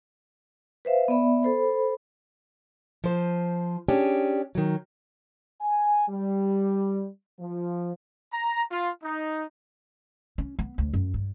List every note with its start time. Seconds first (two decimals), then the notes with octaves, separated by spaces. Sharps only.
0.85 B4 C5 E5 F5
1.08 B3 D5 E5 B5
1.43 A4 C5 B5
3.04 F3 C5
3.88 C#4 D4 G4 G#4
4.55 D#3 F#3
5.62 G#5
6.09 G3
7.40 F3
8.32 A#5
8.71 F4
9.03 D#4
10.38 C#4
10.59 B3
10.78 D2
10.93 F#2
11.14 G2